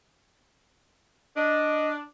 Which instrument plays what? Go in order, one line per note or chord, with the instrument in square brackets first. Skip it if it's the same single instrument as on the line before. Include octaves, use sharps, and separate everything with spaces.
[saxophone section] D4 [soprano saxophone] D#5